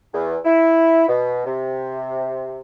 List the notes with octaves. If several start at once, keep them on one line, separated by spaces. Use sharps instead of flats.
E2
E4
B2
C3